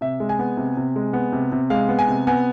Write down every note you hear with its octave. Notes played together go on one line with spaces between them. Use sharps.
C3 E5
G#3
G#5
B3
C3
C3
G#3
B3
C3
C3
G#3 F5
B3
G#5
C3
B3 G#5